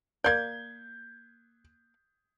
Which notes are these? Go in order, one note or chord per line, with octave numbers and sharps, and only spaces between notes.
A#3 D5 G6 G#6